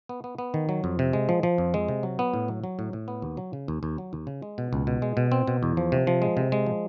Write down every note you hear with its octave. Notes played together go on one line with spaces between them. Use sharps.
B3
B3
B3
D#3
F#3
F2
C3
G#3
F3
F3
F2
G#3
C3
F#3
B3
A2
F#3
F#3
A2
A2
B3
D#2
F#3
C#3
D#2
D#2
F#3
D#2
C#3
G#3
B2
C#2
B2
G#3
B2
C4
B2
E2
F3
C3
F3
G#3
C3
G#3
F3